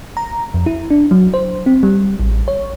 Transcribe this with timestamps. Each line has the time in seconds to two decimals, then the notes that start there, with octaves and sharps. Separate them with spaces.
0.17 A#5
0.54 F2
0.66 E4
0.91 D4
1.11 F#3
1.34 C5
1.66 C4
1.83 G3
2.20 A1
2.48 C#5